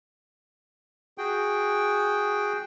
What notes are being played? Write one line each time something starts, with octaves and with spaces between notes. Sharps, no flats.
F#4 G#4 G5